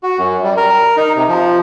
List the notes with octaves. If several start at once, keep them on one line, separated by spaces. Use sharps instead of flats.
F#4
F#2
G3
A#4
D#4
C3
F3